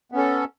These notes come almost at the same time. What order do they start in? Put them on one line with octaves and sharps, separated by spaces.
B3 C#4 A4